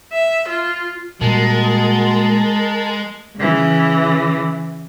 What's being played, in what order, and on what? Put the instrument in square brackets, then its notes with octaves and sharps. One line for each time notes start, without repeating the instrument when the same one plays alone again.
[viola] E5
F4
[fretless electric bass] A#2 G3 [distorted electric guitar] G#3 [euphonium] F#4 [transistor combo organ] A#4 A5
[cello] C#3 E3